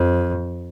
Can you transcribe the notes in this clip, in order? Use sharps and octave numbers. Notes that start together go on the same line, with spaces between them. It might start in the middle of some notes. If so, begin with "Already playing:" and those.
Already playing: F2